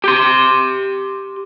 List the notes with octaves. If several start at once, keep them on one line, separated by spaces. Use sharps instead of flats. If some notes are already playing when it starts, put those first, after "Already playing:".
G4 C6